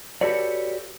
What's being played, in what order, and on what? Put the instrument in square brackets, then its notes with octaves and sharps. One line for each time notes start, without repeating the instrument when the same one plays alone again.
[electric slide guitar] F#4 G4 A4 B4 C#5 D5